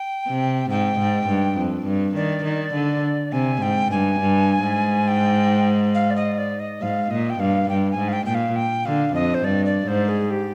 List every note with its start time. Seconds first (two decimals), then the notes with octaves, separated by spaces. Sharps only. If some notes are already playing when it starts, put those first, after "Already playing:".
Already playing: G5
0.27 C3
0.70 G#2 G5
1.00 G#2
1.29 G2
1.58 F2
1.86 G2
2.15 D#3 D5
2.45 D#3
2.74 D3
3.32 C3 G#5
3.62 G#2 G5
3.91 G2 G#5
4.20 G2
4.63 G#2
5.08 G5
5.94 F5
6.10 D5
6.16 D#5
6.38 D5
6.60 D#5
6.81 G#2 F5
7.11 A#2 D#5
7.30 G5
7.40 G2 F5
7.69 G2 G5
7.91 G#5
7.98 G#2
8.08 F5
8.13 G5
8.26 A#2 G5
8.35 F5
8.56 G5
8.85 D3 F5
9.14 F2 D#5
9.34 C5
9.44 G2 D5
9.66 D5
9.87 G#2 C5
10.09 G#4
10.31 G4